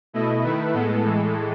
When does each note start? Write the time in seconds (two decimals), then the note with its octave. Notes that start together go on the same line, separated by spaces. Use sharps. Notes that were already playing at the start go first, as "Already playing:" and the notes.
0.13 B2 A3 E4 D#5
0.44 D#3 A3 E4 B4
0.73 A2 G#3 B3 A4
1.03 A2 E3 G#3